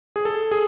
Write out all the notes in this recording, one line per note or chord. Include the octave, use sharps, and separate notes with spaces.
G#4
A4
G#4